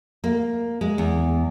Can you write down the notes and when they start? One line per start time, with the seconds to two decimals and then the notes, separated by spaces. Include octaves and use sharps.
0.24 A#3
0.81 G#3
0.98 E2